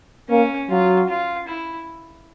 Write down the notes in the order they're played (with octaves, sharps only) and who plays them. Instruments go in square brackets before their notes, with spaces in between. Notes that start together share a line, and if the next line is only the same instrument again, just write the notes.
[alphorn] A#3 [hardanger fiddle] C#4
[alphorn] F#3 [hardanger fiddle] F4
[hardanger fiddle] F4
E4